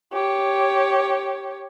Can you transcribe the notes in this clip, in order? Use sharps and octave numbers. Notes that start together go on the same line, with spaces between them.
G4 C#5